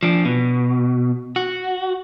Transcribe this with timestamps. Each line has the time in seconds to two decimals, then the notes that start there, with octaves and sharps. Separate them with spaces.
0.03 F3 D4
0.25 B2
1.36 F#4